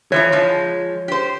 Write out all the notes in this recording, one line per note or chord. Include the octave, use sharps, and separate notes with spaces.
E3 F3 C#5 A#5
F3 G#3
G4 C5